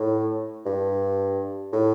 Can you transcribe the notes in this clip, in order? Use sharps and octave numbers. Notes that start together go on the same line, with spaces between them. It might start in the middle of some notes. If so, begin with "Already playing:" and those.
Already playing: A2
G2
A2